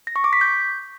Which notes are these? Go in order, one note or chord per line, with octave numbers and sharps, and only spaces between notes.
A#6
C#6
D6
B6
G6